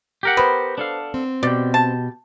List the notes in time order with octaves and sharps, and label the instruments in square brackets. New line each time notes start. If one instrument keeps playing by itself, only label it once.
[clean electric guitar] G4 A#4 F#5
[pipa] B3 [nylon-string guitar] B4 C5
[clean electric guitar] D4 A4 F5
[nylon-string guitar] C4
[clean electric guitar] B2 G4 [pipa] D5
[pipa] A5